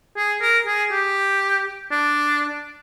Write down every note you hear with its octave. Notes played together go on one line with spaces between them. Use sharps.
G#4
A#4
G#4
G4
D4